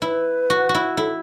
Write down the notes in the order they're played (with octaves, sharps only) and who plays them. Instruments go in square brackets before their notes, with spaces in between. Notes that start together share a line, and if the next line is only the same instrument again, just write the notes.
[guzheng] E4 [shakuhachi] B4
[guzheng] F#4
F#4
E4
[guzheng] E4 [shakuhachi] A4